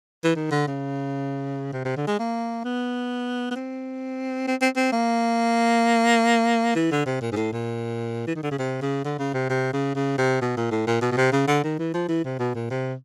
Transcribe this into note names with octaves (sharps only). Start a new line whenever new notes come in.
E3
D#3
D3
C#3
C3
C3
D3
G#3
A#3
B3
B3
C4
C4
C4
C4
A#3
E3
D3
C3
A#2
G#2
A2
A#2
E3
D#3
D3
C#3
C3
C#3
D3
C#3
C3
C3
C#3
C#3
C3
B2
A#2
A2
A#2
B2
B2
C3
C#3
D3
D#3
E3
F3
E3
C3
B2
A#2
C3